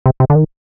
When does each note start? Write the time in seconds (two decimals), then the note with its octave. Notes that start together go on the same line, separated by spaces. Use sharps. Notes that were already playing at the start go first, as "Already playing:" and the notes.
0.06 C3
0.20 C3
0.30 D3
0.35 D#3